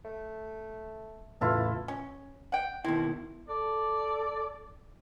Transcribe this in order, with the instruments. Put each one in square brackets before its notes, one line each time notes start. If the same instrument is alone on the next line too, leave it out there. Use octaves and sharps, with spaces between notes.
[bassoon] A3
[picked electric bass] E2 A2 C#3 [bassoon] E3 [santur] E4 F4 A4
[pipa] C#4
F#5 G5
[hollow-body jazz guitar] B2 D#3 E4 [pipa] C4
[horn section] A4 D5